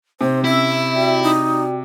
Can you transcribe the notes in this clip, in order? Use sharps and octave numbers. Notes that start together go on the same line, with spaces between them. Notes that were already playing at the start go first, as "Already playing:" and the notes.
C3 D#4 C5
C4 C#4 E4 E5 E6
F#4 D5 G5
D#4